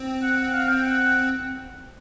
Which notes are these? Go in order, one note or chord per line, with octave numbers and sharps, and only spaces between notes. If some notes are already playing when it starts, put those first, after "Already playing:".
Already playing: C4
F#5
F#5
F5
G5
F#5